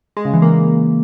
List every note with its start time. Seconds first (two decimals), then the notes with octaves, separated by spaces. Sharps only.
0.17 G#3
0.25 C#3
0.34 E3
0.42 A#3